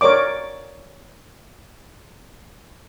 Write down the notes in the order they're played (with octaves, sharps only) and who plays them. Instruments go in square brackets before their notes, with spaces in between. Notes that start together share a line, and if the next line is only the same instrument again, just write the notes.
[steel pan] A#4 C#5 D5 D6